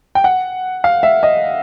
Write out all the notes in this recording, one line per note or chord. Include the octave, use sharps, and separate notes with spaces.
G5
F#5
F5
E5
D#5